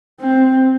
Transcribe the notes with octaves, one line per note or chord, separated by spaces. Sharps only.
C4